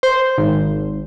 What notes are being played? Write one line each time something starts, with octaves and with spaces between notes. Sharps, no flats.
C5
G#1